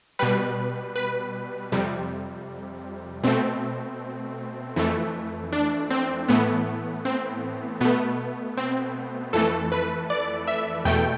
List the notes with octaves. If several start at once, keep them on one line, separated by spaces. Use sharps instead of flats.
B2 G3 B4
B4
F2 C3 G3
B2 A3 C4
F2 E3 A3
D4
C4
A2 E3 A3 B3
C4
B2 A3 B3
C4
F2 E3 A3 A4
B4
D5
E5
E2 B2 A3 G5